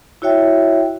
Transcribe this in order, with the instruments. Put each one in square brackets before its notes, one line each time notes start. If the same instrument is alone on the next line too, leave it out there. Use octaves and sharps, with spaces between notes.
[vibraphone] E4 F#4 C#5 E5 G5